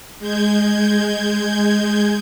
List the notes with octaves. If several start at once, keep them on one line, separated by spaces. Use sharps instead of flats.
G#3 G6 G#6